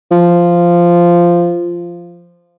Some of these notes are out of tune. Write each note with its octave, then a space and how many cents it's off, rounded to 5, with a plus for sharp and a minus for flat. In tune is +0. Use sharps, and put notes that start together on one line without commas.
F3 -10